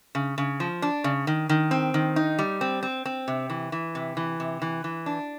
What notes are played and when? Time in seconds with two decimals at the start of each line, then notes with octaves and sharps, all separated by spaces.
0.15 C#3
0.38 C#3
0.60 F3
0.82 D4
1.04 C#3
1.27 D#3
1.49 D#3
1.71 C4
1.94 D#3
2.16 D#4
2.39 G3
2.61 C4
2.83 C4
3.05 C4
3.28 C3
3.50 E3
3.72 E3
3.95 C3
4.17 E3
4.40 C3
4.62 E3
4.84 E3
5.06 D4